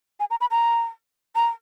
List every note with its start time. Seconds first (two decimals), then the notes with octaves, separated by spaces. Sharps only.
0.20 G#5
0.30 A#5
0.41 B5
0.51 A#5
1.35 A#5